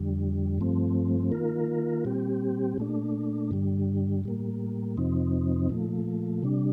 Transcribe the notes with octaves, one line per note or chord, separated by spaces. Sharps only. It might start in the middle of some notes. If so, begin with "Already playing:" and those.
Already playing: F2 D3 G3
G2 F3 A3 C4
D#3 A#3 F4 A#4
A#2 G3 C4 G4
A#2 A3 D4
G2 D3 G3
A2 G3 A#3
F2 C3 F3 C4 D#4
A#2 F3 A3
C3 G3 D4